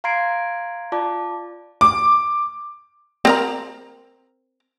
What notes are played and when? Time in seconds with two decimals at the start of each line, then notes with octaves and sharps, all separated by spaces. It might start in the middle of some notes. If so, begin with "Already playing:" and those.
0.04 F5 A#5 C6 G#6 C7 D7
0.92 F4 D5 A5 D6
1.81 D6
3.25 C4 A#4 A#5